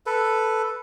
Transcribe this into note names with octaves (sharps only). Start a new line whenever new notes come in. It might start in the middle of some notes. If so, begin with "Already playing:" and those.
A4 B4